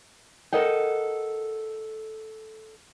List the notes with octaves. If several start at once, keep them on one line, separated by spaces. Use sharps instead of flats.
A4 A#4 D#5 F#5 G5